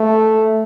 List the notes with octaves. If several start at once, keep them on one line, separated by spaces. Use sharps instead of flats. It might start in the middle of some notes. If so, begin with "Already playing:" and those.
Already playing: A3